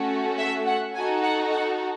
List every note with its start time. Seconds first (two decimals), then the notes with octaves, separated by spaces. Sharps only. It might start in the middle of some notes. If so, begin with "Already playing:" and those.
Already playing: A3 C#4 F#4 A4
0.39 E5
0.67 F#5
0.95 D#4 F#4 A4 G#5
1.24 F#5
1.52 F#5